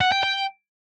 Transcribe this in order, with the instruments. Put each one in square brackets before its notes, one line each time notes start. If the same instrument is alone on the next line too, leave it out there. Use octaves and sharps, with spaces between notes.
[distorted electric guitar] F#5
G5
G5